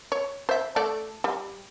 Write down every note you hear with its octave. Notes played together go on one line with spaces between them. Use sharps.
C#5
C5 E5
A3 A4 D5
G3